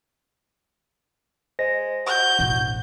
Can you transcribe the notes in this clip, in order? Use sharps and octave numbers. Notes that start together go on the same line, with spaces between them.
G#3 C5 A#6
F#4 G6
E1 A1